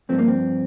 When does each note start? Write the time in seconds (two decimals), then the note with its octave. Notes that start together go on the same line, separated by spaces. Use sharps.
0.09 G2 F3 A3 C4
0.18 A#3
0.28 C4